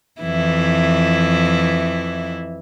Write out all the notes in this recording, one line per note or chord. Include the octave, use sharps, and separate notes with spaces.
F2 E3 E4